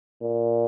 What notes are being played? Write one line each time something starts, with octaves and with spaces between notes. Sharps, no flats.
A#2